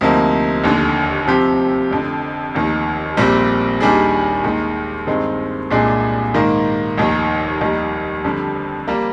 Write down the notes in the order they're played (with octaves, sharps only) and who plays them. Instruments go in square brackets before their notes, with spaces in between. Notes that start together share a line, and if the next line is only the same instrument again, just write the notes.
[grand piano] D2 C3 F3 A#3 D#4
F1 D#2 D3
C3 F3 C4 G4
F1 F2 D3
F1 D#2 D#3
A#1 A#2 G3 C4
D#2 D#3 G3 D4 G#4
D#2 D#3 G#3
G2 D#3 G#3 C4
C2 A#2 G#3 D4 G#4
G#2 D#3 A#3
F1 D#2 D#3
F1 D#2 D#3 G3
F2 D3 G3
G3 A#3